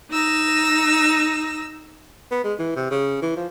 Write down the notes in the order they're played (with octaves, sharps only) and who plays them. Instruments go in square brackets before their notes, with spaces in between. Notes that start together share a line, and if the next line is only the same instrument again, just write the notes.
[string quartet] D#4 E6 A#6
[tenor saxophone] B3
G#3
E3
C3
C#3
E3
F3